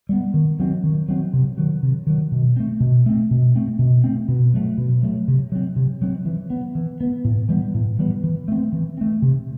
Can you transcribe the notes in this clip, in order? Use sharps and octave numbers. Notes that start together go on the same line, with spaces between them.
G3 B3
D#3
F#3 C4
D#3
F#3 C4
C3
D#3 F#3
C3
D#3 F#3
B2
A3 C4
B2
A3 C4
B2
A3 C4
B2
A3 C4
B2
F#3 A3
B2
F#3 A3
C3
F#3 C4
C3
F#3 C4
E3
B3
E3
B3
A2
E3 G3 B3
A2
E3 G3 B3
E3
A3 C4
E3
A3 C4
C3